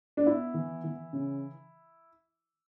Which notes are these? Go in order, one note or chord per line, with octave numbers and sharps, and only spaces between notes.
D4
B3 E4
E3
E3
C#3